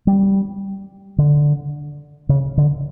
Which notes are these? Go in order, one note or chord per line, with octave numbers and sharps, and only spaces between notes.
G3
D3
C#3
D3